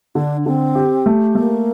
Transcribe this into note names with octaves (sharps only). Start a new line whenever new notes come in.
D3 D4
D3 C4
G4
A3
A3 A#3